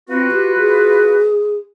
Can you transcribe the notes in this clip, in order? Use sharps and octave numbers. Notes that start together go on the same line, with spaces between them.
C4 F4 F#4 B4
G4
G#4